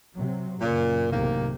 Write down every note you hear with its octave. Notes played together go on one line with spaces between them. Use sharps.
C3 F#3
F#2 A#2 C#3
B1 A2 C3 D#3 A#3